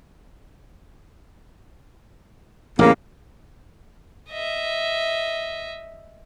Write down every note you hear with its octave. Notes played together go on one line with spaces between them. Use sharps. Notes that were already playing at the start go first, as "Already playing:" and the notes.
A1 E2 C#3 A#3
D#5 E5